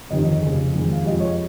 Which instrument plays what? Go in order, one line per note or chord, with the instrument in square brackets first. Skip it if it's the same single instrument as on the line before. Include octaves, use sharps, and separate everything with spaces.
[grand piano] G1 F2 C3 D#3 D#5
F1 F2 C#3
F2 D#3 G#3
F5
F2 C3 F3 G#3 D#5
C#5